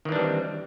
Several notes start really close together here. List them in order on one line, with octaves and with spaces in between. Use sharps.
D#3 E3 D4 G3 C4